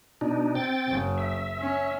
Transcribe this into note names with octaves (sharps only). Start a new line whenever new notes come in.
B2 D4 D#4
C4 G5 A6
F#1 C#3
E5
C#4